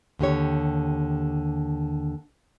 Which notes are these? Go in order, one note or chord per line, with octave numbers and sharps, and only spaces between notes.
D#2 D3 G4 C#5